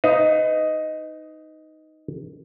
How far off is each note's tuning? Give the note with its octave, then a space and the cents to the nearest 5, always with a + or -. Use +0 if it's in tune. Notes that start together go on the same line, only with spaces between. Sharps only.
D#4 +5 B4 +35 F5 +0